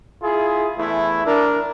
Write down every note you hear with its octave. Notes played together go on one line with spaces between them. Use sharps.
E4 F4 G#4
E2 A3 E4
D4 A#4